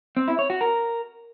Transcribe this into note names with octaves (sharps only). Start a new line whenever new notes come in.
C4
E4
C#5
F#4
A#4